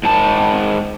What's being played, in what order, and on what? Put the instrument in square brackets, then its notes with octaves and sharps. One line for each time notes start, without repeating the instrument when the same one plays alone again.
[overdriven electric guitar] G#2 A5